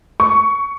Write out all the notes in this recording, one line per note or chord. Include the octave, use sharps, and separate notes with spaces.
C#6